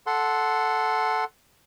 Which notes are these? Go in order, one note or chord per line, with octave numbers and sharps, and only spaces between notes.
A4 F#5 C6